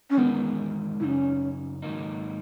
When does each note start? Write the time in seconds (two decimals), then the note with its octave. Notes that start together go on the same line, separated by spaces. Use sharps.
0.10 C#4
0.17 E2 D#3 G#3 B3 D#4 A#4
1.00 F#2 C#3 C#4 D#4 E4
1.82 G#2 D#3 F#3 A#3 D#4